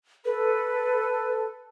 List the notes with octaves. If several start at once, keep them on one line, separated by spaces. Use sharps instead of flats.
A4 B4